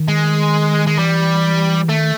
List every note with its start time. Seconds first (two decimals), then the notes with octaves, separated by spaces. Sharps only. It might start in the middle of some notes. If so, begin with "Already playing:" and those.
Already playing: D#3
0.08 G#3
0.87 G#3
0.99 E3 G3
1.89 D#3 A3